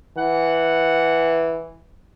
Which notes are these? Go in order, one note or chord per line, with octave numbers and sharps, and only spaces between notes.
E3 F#5